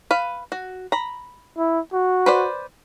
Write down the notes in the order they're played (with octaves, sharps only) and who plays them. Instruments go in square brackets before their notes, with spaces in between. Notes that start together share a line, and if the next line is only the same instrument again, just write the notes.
[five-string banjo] B4 F5
F#4
A#5 B5
[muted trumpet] E4
F#4
[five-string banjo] B4 C5 D5